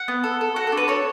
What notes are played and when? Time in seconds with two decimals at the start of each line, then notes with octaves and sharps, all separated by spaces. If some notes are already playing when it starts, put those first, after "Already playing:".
Already playing: F#5
0.08 B3
0.24 A4
0.41 A4
0.56 F#4 F#5
0.67 A4
0.72 D4
0.77 B4
0.88 A4 C#5